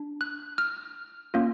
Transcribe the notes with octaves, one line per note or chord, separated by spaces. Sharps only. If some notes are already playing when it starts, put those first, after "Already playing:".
Already playing: D4
F#6
F6
A#3 C#4 F4